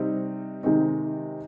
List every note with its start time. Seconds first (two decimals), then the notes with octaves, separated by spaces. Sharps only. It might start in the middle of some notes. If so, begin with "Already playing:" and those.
Already playing: C3 G3 C4 D#4
0.63 C3 D#3 G#3 C4 D#4